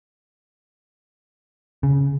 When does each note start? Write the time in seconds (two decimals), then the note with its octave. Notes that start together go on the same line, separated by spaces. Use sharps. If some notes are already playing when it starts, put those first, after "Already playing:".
1.83 C#3